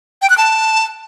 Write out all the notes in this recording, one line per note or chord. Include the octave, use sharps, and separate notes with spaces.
G5
F#6
A5